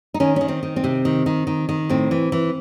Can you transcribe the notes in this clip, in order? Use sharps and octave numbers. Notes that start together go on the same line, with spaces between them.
D#4
D#3 C#4
D#3 C#4
C4
D#3
C4
C3
D#3
D#3
D#3
D#3
A2 C4
E3
E3